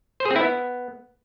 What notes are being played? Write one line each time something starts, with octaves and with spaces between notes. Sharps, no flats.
C5
G#4
C4
E4
B3